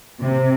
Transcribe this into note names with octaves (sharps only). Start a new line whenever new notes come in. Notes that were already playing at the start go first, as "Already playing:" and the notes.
C3